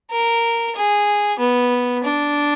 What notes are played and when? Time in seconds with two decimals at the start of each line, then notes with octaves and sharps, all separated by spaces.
0.11 A#4
0.76 G#4
1.39 B3
2.04 D4